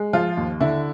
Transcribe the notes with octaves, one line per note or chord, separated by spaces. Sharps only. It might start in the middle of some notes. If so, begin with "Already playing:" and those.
Already playing: G#3
F3 F4
D#2
D3 E4